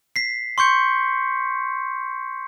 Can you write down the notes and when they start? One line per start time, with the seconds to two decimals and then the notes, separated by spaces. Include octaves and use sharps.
0.16 B6 C7
0.58 C6 C#6 G6 C#7